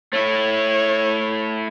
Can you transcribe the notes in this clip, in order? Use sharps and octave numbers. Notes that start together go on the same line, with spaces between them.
A3 E4 C#5